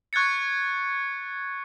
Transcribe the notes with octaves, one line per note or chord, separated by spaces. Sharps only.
C#6 F#6 G#6 A6 C#7